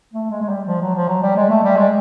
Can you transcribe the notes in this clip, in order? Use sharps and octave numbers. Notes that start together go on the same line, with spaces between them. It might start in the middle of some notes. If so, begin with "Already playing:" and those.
A3
G#3
G#3
G3
F3
F#3
F3
F#3
G3
G#3
A3
G3
G#3